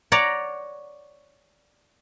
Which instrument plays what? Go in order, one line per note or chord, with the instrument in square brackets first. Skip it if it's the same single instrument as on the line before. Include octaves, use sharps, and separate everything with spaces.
[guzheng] C#5 D5 F#5 A#5